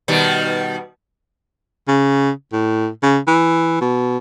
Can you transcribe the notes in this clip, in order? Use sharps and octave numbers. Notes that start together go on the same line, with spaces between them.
B2 D#3 G3
C#3
A2
C#3
E3
B2